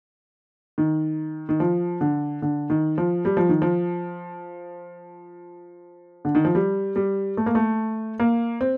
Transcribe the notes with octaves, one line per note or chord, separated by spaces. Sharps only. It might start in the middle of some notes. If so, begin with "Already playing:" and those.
D#3
D#3
F3
D3
D3
D#3
F3
G3
F3
D#3
F3
D3
D#3
F3
G3
G3
A3
A#3
A3
A#3
C4